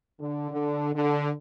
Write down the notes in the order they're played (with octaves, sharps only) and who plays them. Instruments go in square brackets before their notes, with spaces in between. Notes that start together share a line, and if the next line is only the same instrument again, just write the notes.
[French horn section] D3
D3
D3